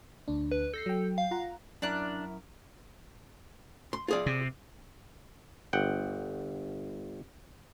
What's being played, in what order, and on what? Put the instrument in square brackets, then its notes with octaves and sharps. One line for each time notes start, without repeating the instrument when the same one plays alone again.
[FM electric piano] D2 D4
[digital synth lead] B4
[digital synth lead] A4 [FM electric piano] G6 A#6 C7
[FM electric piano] F#3 G5
[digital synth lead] F5
[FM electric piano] F4 F#5 A#5
[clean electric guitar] F#2 E4 A#4 [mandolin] D4 D5 F#6
[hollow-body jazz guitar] C6
F4 G#4 D5
[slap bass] C3
[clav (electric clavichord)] G1 F#5 G5